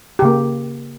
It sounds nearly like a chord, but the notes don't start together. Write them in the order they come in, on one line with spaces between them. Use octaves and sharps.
G4 C#3 A#3